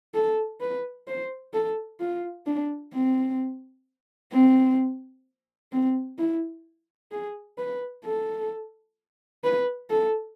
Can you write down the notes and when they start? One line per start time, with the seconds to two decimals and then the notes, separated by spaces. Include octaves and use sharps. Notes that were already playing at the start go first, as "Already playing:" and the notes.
0.14 A4
0.61 B4
1.07 C5
1.53 A4
2.00 F4
2.46 D4
2.93 C4
4.33 C4
5.72 C4
6.19 E4
7.12 G#4
7.58 B4
8.05 A4
9.44 B4
9.90 A4